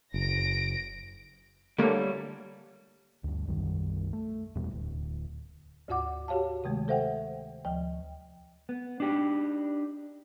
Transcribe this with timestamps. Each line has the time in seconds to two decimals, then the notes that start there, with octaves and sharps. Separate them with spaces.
0.14 F#1 A#6 D7
1.79 D3 G3 A3 A#3 C#5
3.24 D2 G2
3.47 B1 F#2 D#3 G3
4.13 A3
4.55 E2 B2 G3
4.71 D1
5.88 D2 G#2 F4 D5 F#5 D6
6.28 F#4 G4 C#5 F5 A5
6.64 C3 D#3 G#3 A3
6.88 A4 C5 E5 F#5 G5
7.65 D2 F3 G5
8.69 B3
9.00 D4 D#4 G4